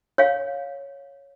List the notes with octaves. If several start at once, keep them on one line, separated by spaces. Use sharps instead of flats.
C#5 F5